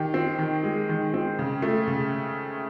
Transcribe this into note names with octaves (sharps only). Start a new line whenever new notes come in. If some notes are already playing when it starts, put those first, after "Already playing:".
Already playing: D#3 G4
C4
D#3
G#3
D#3
C4
C#3
A3
C#3